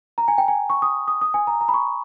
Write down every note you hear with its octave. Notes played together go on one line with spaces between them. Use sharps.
A#5
G#5
G5
G#5
C#6
D#6
D#6
D#6
G#5
A#5
A#5
B5
C#6